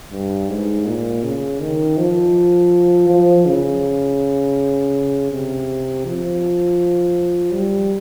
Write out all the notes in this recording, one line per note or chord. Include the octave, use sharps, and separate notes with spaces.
G2
G#2
A#2
C#3
D#3
F3
F3
C#3
C3
F3
G3